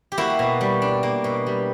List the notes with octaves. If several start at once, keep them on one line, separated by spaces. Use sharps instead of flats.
G4
A#3 E4 F#4
B2
G3
D4
A#3
B2
G3